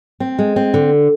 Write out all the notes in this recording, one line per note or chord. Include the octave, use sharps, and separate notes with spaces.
C4
G#3
C4
D3